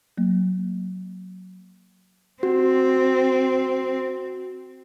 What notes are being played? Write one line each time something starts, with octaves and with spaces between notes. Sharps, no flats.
F#3 A#3
C4 F#4